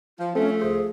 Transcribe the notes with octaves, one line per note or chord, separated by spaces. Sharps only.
F3 F4
F3 A3 C4 C#4 A4 E5
C#2 G#4 C5 E5